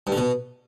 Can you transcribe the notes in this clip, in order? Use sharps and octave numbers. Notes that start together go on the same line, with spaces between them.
G2
D3
B2